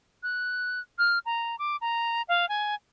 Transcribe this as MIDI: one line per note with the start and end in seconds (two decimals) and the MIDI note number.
0.23 0.80 90
0.98 1.19 89
1.26 1.58 82
1.59 1.76 86
1.81 2.22 82
2.28 2.48 77
2.49 2.75 80